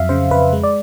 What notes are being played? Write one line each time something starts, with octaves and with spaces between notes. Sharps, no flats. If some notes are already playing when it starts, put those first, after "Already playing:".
Already playing: F2 F#3 E5 F5
C#3 C5
F2 B4
G#3
D5